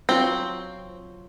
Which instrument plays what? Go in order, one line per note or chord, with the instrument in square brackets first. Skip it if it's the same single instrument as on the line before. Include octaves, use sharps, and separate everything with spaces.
[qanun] F#3 F4 G5 [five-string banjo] C4